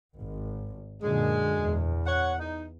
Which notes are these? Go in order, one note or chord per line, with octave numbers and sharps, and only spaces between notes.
G#1
F#2 A#2 D3 G#3
E2
C#5 F#5
D#4